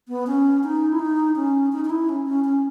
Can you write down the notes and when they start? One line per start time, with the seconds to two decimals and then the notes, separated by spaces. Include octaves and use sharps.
0.08 B3
0.27 C#4
0.64 D#4
0.92 E4
0.99 D#4
1.36 C#4
1.72 D#4
1.85 D#4
1.90 E4
2.09 C#4
2.26 C#4
2.44 C#4